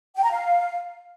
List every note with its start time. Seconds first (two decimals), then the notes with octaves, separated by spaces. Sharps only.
0.16 G5
0.23 A#5
0.30 F5